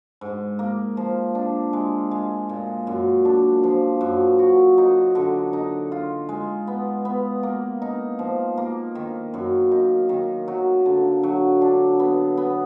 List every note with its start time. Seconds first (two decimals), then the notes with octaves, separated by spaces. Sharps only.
0.21 G#2
0.59 A#3
0.97 F3
1.35 D4
1.73 G#3
2.11 G#3
2.49 A#2
2.87 F#2
3.25 D4
3.63 F3
4.01 F#2
4.39 F#4
4.78 D#4
5.15 D3
5.53 D#4
5.92 F4
6.29 G#3
6.67 B3
7.05 B3
7.43 A#3
7.82 D#4
8.19 F3
8.58 A#3
8.95 D#3
9.34 F#2
9.71 D#4
10.09 D#3
10.48 F#3
10.86 D3
11.23 F#3
11.62 D4
12.00 B3
12.37 B3